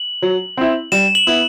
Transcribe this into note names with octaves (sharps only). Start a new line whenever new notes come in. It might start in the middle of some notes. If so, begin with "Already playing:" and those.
Already playing: F#7
F#3
C4 E4
G3 E7
F#7
B3 E4